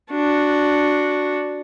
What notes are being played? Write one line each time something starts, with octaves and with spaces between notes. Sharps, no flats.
D4 F#4